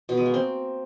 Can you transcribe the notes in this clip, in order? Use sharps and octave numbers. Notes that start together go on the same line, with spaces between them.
B2
G#3
A#3
C4